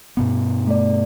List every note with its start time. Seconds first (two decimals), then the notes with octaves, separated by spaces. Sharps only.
0.17 G2 B2 B3
0.67 A3 D5